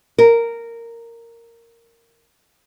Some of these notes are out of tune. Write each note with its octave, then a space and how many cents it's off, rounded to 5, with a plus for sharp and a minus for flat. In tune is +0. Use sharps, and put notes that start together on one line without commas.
A#4 -10